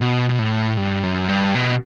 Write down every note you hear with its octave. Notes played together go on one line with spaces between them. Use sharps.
B2
B2
A2
G2
F#2
G2
B2